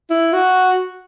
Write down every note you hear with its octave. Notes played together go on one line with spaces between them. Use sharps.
E4
F#4